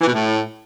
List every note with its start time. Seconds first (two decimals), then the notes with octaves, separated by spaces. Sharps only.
0.01 E3
0.07 B2
0.14 A2